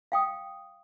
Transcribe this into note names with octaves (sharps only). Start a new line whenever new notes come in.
F5 G5 D#6